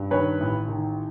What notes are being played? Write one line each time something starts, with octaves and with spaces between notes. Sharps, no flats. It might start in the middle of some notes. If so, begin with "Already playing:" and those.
Already playing: G2
D#3 B4 C#5
A1
D#3